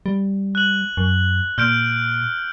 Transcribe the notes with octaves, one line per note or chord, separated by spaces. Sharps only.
G3
F#6 F#7
F#2
A#2 F6 G6 D7